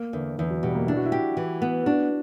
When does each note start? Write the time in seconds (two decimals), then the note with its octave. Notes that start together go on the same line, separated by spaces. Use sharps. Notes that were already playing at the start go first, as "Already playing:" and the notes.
Already playing: A#3
0.13 E2 D3
0.38 E2 E3
0.50 F#3
0.63 B2 G3
0.75 A#3
0.87 D4 E4
0.97 F#4
1.06 E4
1.12 G4
1.37 E3
1.62 B3
1.86 D4 F#4